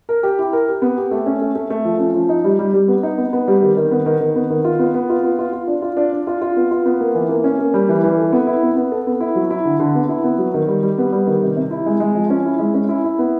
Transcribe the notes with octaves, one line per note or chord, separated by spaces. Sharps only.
A#4
G4
E4
A#4
G4
B3
G4
A3
C#4
A3
A3
A3
F3
C#4
F3
D#4
G3
G3
G3
B3
D#4
B3
B3
G3
D#3
D#3
B3
D#3
D#3
B3
D#3
F4
B3
B3
F4
B3
F4
F4
D4
F4
D4
D4
F4
F4
B3
F4
B3
A#3
E3
A#3
C#4
A#3
G3
E3
E3
A4
B3
E4
B3
B3
A4
B3
E4
F#3
E4
D3
D3
B3
E4
B3
F#3
D#3
G3
G3
B3
G3
D#3
C3
C3
E4
G#3
G#3
F3
C#4
E4
G#3
C#4
E4
E4
B3